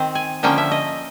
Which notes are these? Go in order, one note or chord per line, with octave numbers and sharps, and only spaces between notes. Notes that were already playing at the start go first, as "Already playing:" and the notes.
Already playing: D#3 C4
G#5
D3 F3 A#3 C#4 G5
E5
D#5